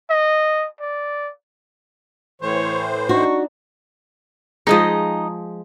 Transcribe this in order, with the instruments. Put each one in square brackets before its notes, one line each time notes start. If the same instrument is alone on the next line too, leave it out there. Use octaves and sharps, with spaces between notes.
[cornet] D#5
D5
[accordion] A2 E3 C5 [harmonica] C#5
[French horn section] D4 D#4 [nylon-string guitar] F#4 [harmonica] C#6
[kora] F3 G#3 G#4 [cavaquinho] D#4 D#5